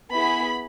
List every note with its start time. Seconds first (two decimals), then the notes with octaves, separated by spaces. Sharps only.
0.12 B3 E4 G#4 B5